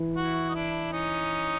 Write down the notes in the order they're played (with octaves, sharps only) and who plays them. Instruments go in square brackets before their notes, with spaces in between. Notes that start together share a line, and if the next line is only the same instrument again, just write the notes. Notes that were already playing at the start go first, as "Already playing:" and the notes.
Already playing: [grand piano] E3
[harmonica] E4 F#4
D#4
D4 E4
C#4 D#4